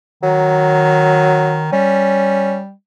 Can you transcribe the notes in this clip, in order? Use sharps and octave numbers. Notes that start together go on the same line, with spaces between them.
D#3 F#3
G3 C#4